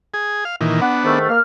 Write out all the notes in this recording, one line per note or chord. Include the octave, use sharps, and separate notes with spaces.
G#4
F5
A#2 D#3 E3
B3 D4 F#5
G#2 D#3 A3
A#3 F6